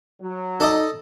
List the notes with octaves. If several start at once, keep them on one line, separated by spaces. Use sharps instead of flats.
F#3
D#4 A4 D5 D#5